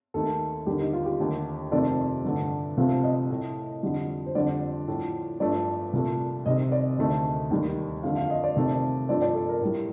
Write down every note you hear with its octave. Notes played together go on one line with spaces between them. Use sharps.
D#2 D#3 A3 A4
D#2 D3 G3 G4
D#4
F4
G4
D#2 D3 A3
F2 C3 D#3 A3 D5
G2 D3 A3
C2 C3 F3 A3 F5
D#5
A2 A3
F2 D3 G3
C5
F2 D3 G3 D5
A2 F3 A3
G2 F3 A3 D5
C2 A#2 A3
C2 C3 D#3 D#5
D5
D2 C3 D#3 A3 D#5
D#2 D#3 G3
F2 D3 A3 F5
F5
D#5
D5
C2 C3 D#3 A3
G2 F3 A3 D5
D5
A4
A#4
A2 G3